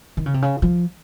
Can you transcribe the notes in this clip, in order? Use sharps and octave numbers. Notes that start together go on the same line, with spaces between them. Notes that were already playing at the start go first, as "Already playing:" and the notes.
D#3
C#3
C3
C#3
F3